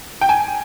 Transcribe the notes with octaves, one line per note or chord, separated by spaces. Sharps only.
G5
G#5